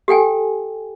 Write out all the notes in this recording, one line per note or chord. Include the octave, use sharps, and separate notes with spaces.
G4 A4 G5 G#5